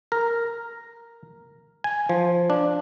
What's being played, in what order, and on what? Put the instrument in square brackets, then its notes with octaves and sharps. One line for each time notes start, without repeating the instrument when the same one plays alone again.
[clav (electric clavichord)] A#4
G#5
F3
D4